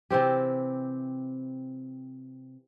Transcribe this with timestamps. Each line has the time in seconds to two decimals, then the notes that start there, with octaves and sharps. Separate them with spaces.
0.10 C3 E3 C4 G4